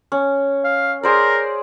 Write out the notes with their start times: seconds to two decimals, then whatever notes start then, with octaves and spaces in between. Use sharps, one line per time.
0.12 C#4
0.64 F5
1.03 G#4 A#4 C5 D5